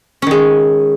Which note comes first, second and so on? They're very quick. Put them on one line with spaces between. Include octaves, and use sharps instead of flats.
C#4 D#3 G#3